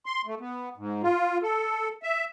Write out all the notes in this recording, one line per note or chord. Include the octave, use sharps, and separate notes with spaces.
C6
A3
B3
G#2
F4
A4
E5